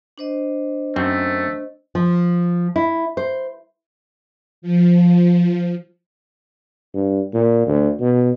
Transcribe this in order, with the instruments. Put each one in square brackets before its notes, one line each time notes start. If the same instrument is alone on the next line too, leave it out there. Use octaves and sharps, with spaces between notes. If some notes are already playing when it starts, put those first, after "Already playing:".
[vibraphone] D4 C5 D#5
[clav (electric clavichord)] F#2 C4 [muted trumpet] A3
[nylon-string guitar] F3
E4
C5
[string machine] F3
[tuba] G2
A#2
D2
B2